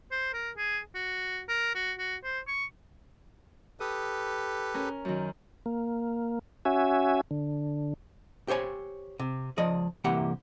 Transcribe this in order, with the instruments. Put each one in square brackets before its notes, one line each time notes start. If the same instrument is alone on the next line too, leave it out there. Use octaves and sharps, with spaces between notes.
[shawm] C5
A#4
G#4
F#4
A#4
F#4
F#4
C5
C#6
[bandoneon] G4 A4 B4 [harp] D#6
[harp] C#4 A#4
F#2 D#3
[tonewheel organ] A#3
C#4 F#4 E5 G#5
D3
[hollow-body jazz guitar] G4 C5 C#5 G#5
C3
C#2 F3 D5 D#5
C2 E3 A#3 G4 F#5